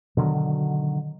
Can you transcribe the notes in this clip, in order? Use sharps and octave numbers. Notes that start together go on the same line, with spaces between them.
B2 D3 D#3 F#3